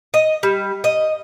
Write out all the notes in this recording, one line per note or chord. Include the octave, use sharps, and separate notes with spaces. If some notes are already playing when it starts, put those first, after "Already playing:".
D#5
G3
D#5